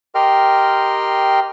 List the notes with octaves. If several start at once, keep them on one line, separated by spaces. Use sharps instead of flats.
G4 A#4 D#5 G5 C6 F6